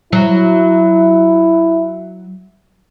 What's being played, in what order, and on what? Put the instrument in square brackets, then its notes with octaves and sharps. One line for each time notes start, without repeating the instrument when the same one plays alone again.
[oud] F#3 [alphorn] E4